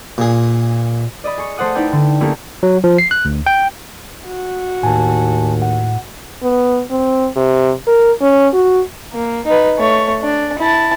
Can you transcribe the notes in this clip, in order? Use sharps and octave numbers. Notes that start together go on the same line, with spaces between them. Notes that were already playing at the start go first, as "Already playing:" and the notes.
A#2 G#4
D5 D#5 B5
G#4 C#6
A3 C5 D5 F#5 D#6
D#4 E4 B4 D5 G5
D3
A3 A#3 C#4 D#4 E4 G4
F#3
F3
C7
F#6
D2
G5
F#4
D#2 A2 G#5 A5
F#5
B3
C4
C3
A#4
C#4
F#4
A#3
D#4 B4
A3 C#5
D4
E4 A5